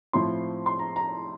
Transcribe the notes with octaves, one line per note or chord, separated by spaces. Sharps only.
A2 F3 C4 E4 C6
C6
A#5
A#5